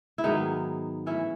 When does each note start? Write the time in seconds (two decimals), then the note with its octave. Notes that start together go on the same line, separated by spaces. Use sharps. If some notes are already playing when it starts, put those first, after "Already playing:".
0.18 E4
0.24 G#2 D#3 F#3 B3 D#4
1.06 A2 E3 C#4 E4